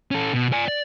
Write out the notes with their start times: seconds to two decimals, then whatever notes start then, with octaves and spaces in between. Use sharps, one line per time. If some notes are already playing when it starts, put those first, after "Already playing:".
0.11 C#4 A4
0.33 B2
0.53 D5 G#5
0.68 D5